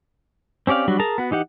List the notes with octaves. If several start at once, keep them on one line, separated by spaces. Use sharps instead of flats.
C4 C#4 G4 D5 F5
F#3 G3 D4 F#4
G#4 A#4 A5 A#5
B3 F#4
E3 D#4 G4 F#5